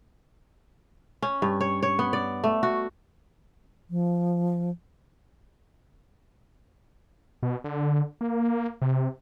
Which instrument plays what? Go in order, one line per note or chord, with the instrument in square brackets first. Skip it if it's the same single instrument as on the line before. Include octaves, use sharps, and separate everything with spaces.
[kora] C#4
G2
C#5
C#5
B3
D5
A3
F#4
[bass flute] F3
[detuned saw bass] B2
D3
A#3
C3